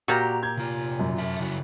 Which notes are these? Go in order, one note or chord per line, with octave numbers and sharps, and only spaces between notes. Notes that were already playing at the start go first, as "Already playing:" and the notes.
A#2 F#4 G4 A#5
G6 G#6
C3 F4
F#2
C3 E5 A5
C#3 E4 F#4